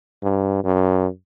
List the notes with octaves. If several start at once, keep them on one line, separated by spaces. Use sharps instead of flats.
G2
F#2